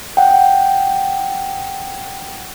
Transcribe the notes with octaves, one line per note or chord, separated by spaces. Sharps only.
F#5 G5